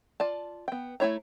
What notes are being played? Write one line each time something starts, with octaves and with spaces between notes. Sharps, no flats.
F4 D5 A5
B3 G5
A3 C4 E4 C#5 A#5